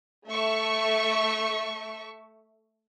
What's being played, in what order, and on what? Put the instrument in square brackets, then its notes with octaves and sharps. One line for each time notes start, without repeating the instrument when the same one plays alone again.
[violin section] A3 E5 C#6